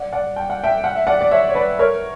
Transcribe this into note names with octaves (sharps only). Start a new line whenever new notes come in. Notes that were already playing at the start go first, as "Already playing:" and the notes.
Already playing: D5 F#5
D5 F#5
G5
F#5
E5 G5
F#5
E5
D5 F#5
D5
C#5 E5
C#5
B4 D5
A#4 C#5